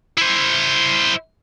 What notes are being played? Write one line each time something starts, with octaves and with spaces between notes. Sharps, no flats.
E4 C5